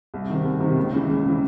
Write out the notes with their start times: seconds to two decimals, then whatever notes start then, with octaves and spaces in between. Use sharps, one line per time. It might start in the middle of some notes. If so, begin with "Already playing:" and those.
0.14 C2
0.30 C3 D#3
0.45 C2
0.60 C3 D#3
0.77 C#2
0.93 C#3 E3
1.09 C#2
1.25 C#3 E3